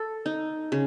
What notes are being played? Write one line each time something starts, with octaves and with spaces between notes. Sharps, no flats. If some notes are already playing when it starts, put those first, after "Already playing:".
Already playing: A4
D#4
C#3